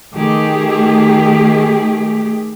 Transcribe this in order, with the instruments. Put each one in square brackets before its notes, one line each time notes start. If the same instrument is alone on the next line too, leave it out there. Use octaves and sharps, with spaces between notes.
[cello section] D#3 A3 G4 G#4